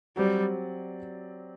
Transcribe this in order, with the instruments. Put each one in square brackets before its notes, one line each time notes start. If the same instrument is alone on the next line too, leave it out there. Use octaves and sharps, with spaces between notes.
[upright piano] F#3 C4 G4 D5 [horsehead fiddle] G3